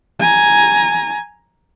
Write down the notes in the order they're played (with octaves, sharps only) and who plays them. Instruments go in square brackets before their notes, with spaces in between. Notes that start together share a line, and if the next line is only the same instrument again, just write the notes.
[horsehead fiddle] G#5 A#5